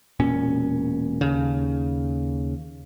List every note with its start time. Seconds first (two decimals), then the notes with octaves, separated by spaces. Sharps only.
0.20 E1 A#2 C#4
1.21 D#2 C#3